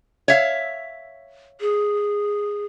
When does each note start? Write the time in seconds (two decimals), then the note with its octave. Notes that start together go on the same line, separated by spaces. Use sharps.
0.28 C#5 E5 F5
1.61 G#4